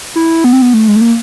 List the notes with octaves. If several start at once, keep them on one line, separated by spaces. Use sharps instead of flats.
E4
B3
C4
B3
A3
G#3
A3
A#3